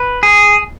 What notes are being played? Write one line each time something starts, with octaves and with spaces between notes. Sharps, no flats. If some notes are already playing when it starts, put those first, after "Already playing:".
Already playing: B4
G#4